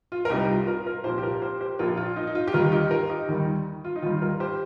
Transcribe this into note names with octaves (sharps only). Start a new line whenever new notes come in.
F4
A#4
C2 C3 G3 D#4 G4
F4
F4 A#4
F4 A#4
C2 A#2 F3 G4 C5
G4
F4 A#4
G4 C5
G4 C5
A#1 A#2 F3 F4 A#4
F4
D#4
D#4
F4
G4
D#2 D#3 G3 F4 A#4
D#4 G4
F4 A#4
D#4 G4
D#2 D#3 G3 D#4
F4
D#4
D#2 D#3 G3 F4
F4 A#4
G4 C5